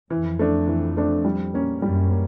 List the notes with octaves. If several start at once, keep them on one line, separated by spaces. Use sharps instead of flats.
F2 E3
A3 D4
E3
A3 D4
G3
A#3 C#4
F#2 G3
A#3